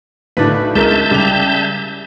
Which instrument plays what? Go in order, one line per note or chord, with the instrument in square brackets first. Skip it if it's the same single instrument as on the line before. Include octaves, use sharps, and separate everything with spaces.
[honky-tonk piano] B1 A2 [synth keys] D3 D4 B4
[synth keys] C#2 [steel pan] G#3 A#4 [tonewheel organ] E5 A5 G6
[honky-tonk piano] C#3 F7 [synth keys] G3